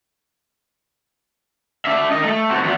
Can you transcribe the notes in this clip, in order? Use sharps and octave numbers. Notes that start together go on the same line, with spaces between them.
D4 E5
A#4 D#5
A3 A4
C4 F#4
E2 B3